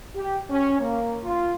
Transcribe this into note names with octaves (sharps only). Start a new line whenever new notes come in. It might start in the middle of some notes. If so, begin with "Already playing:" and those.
G4
C#4
A#3
F4